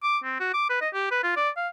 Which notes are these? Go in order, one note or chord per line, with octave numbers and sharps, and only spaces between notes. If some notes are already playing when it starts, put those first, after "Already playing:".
D6
C4
F#4
D6
B4
D#5
G4
B4
F4
D5
F5